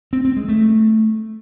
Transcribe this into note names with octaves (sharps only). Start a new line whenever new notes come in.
C4
C4
G#3
A3